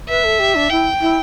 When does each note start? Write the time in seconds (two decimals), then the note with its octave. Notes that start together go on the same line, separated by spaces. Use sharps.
0.09 B4 E5
0.24 A4
0.39 G4
0.55 D4
0.70 E4 G5
1.01 E4